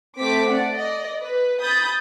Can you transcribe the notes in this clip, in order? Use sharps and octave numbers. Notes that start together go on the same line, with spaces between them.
A3 C4 D6 B6
D5 F#5
D5 D#5
B4
B5 D#6 G6 A6